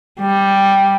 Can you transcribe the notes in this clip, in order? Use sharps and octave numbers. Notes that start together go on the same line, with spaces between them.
G3